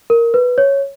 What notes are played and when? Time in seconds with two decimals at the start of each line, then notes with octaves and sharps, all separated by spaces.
0.10 A#4
0.34 B4
0.58 C#5